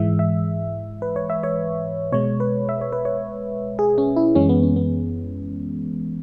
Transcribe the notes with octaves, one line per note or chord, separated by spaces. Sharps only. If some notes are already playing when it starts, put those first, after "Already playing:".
Already playing: G#2 E3 G#3 E5
E5
B4
C#5
E5
C#5
B2 G#3 C#5
B4
E5
C#5
B4
C#5
G#4
C#4
E4
F#2 E3 G#3 C#4
B3
C#4
B3